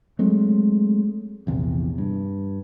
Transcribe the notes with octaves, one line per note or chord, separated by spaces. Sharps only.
F#3 G#3 A3 C4
A#1 E2 C3
G2